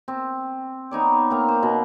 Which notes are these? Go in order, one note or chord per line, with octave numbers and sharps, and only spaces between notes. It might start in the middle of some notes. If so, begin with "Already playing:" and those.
C4
B3 D#4 C#5 D5
A#3 C4 F5
C5
B2